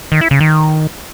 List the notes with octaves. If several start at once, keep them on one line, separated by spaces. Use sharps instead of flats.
D#3
E4
C#3
D#3